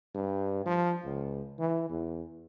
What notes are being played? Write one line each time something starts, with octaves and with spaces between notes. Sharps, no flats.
G2
F3
C#2
E3
E2